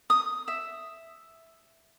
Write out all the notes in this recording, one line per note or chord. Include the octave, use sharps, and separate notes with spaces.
D#6
E5